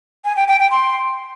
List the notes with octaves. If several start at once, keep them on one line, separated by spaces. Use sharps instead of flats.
G#5
G5
G5
G5
C6